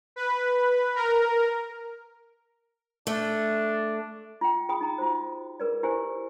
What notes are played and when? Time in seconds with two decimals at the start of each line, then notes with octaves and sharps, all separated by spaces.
0.16 B4
0.95 A#4
3.07 A3 D4
4.41 F4 G5
4.69 F4 G#4 G5 B5 D#6
4.81 D#4 A#5
4.98 F4 F#4 C5
5.60 G#4 A#4 B4 D5
5.83 E4 G4 C5 G#5